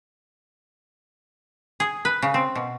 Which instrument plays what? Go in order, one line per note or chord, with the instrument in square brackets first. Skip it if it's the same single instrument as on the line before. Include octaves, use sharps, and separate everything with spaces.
[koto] G#4
B4
C#3
C4
B2